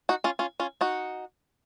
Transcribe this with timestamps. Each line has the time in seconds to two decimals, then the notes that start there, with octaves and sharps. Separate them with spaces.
0.09 D#4 F#4
0.24 C#4 F4
0.39 C#4 F4
0.60 C#4 F4
0.81 D#4 F#4